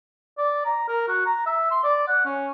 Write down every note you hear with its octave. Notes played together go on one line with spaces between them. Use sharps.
D5
A#5
A#4
F#4
A#5
E5
C6
D5
F#5
C#4